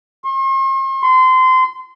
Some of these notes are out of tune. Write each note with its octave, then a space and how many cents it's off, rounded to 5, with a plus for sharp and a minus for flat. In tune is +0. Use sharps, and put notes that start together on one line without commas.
C6 +45
C6 -25